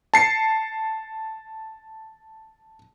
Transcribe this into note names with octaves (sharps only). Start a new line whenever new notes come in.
A5 C7 C#7